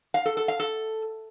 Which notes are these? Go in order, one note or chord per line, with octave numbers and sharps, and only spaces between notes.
F5
A4
A4
F5
A4